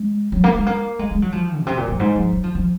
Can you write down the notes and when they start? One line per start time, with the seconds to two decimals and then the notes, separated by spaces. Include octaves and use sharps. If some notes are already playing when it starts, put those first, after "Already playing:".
Already playing: G#3
0.32 F#3
0.44 A#3
0.55 G#3
0.66 A#3
0.99 G#3
1.11 G#3
1.22 F#3
1.32 F3
1.60 A#2
1.67 C3
1.78 A#2
1.88 F#2
2.00 G#2
2.16 F3
2.33 F#3
2.44 F3
2.55 F3